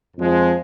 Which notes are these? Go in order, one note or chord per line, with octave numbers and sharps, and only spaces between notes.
F2 F3 G#3